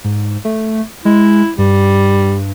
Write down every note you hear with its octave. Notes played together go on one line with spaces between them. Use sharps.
G#2
A3
G#3 E4
G2 G3